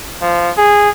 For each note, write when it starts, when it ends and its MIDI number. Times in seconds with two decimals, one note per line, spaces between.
0.21 0.51 53
0.57 0.89 68